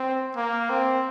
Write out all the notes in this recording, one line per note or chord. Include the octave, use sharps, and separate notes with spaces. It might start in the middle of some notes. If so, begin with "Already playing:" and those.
Already playing: C4
A#3
C4